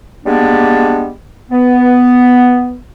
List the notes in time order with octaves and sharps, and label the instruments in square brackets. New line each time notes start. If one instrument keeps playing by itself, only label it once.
[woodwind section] G3 G#3 A#3 B3 D4
B3